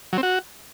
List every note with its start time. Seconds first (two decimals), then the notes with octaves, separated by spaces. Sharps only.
0.13 F#3
0.18 C4
0.23 F#4